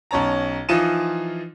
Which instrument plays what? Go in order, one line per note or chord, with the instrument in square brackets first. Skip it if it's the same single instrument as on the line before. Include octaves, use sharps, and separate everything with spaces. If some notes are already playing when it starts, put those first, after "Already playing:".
[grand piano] B1 C#4 C#5 A5 A#5
E3 F3 D#4 F4 D#7 E7